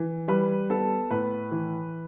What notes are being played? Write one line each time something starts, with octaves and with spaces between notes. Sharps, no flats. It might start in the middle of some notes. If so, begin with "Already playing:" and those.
Already playing: E3
G3 B4 B5
B3 A4 A5
A2 B4 B5
E3